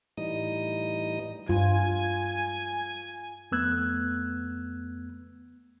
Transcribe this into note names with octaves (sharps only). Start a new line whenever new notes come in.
A2 E3 G3 D#4 D#5 D#6
G2 F4 G#5
F2 A3 B3 E6 F#6 G#6